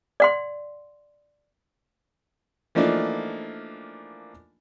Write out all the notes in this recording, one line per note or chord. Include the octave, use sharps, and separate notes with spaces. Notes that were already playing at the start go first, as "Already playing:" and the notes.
D5 F#5 C6
E3 F3 A3 A#3 D4 D#4